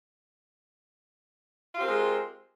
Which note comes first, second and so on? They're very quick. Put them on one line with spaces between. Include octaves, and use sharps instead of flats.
F4 G4 C4 A#4 G#3